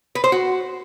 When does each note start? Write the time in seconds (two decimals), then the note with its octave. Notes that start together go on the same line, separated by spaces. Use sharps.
0.15 B4
0.24 C5
0.32 F#4